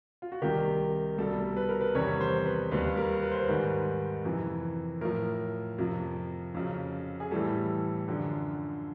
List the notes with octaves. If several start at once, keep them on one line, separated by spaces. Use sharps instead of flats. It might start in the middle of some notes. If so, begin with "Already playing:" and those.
F4
F#4
C2 C3 D#3 G4
C2 B2 G3 A4
B4
A#4
B4
E2 C3 D#3 G3 C#5
C5
B4
D#2 D#3 G3 B4
A#4
B4
C5
B4
G#2 D#3 G3
F2 C3 E3
A2 F3 A#4
F2 C3 F3
F2 C#3 F#3
G#4
A2 E3 G3 A4
F#2 D3 F3